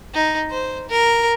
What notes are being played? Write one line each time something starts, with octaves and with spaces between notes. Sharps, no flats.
D#4
C5
A#4